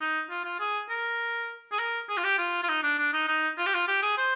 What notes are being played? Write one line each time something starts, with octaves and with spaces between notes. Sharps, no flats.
D#4
F4
F4
G#4
A#4
G#4
A#4
G#4
F4
G4
F4
F4
D#4
D4
D4
D#4
D#4
F4
G4
F4
G4
G#4
C5